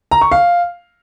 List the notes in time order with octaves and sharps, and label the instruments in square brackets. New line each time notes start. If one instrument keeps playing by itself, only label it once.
[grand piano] A#5
C#6
F5